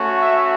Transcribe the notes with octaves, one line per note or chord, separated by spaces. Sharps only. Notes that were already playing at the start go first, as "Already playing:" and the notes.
Already playing: A3 C#4 F#4
E5